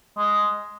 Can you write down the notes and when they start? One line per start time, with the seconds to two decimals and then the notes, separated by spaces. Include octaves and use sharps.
0.17 G#3